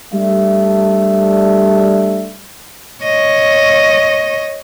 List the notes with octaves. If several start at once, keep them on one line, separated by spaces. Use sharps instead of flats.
G3 A3 D4 E5
C#5 D#5